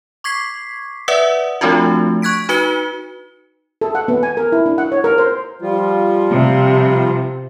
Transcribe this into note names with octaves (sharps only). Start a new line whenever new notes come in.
C#6 D6 G#6 B6 C7
B4 D5 E5 F#5 D#6 E6
F3 A3 C4 D4 F4 F#4
C#6 F#6 G#6 B6 D7
D#4 F#4 B4 C#7 G7
A4
F#5
B3
G#5
A#4
E4
D4
F#5
C#5
A#4
C5
F3 G3 F4
C3